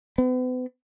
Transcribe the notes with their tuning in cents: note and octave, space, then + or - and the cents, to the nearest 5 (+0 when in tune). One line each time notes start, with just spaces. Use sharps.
B3 +40